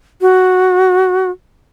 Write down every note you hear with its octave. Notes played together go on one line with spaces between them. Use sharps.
F#4